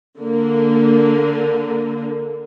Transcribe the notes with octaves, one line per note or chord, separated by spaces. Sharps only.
D3 A#3